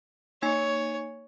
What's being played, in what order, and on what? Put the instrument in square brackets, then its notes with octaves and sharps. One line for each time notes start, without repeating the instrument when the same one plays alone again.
[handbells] A#3 D#4 G#5 [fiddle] C#5